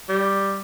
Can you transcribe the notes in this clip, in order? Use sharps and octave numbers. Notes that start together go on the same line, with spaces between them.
G3